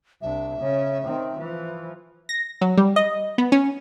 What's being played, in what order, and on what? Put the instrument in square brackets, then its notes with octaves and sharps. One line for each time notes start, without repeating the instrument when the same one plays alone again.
[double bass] C2 D4 [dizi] E5
[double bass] C#3 C#4
D#3 C4
E3 F3
[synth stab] A#6
F#3
G3
D#5
B3
C#4